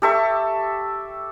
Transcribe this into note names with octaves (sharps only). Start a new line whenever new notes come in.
G4 A4 E5 C#6